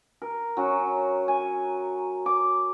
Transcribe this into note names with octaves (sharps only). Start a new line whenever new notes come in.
A#4
F#3 C#4 F#4
G#5
D6